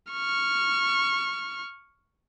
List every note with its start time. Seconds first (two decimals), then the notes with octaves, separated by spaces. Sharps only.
0.11 C#6 F6